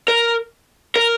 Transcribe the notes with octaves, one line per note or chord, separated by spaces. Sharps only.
A#4
A#4